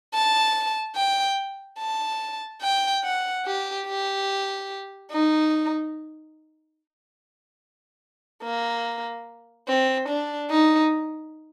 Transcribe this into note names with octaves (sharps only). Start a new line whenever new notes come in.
A5
G5
A5
G5
F#5
G4
G4
D#4
A#3
C4
D4
D#4